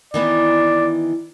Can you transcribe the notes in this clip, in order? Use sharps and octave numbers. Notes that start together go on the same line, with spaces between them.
D#3 E3 B3 D5